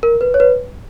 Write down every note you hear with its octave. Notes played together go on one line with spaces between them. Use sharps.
A#4
B4
C#5
B4